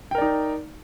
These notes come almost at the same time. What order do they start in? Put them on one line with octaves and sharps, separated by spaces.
G5 A#4 D5 D#4